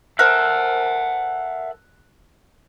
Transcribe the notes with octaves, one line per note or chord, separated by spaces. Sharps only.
A4 A#4 C5 E5 F#5 F#6